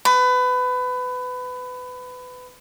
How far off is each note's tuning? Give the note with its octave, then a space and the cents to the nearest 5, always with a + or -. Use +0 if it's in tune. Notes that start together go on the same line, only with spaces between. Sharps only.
B4 +25